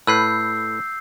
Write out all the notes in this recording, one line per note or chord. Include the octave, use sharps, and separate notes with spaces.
A2 B4 E6 G6 C7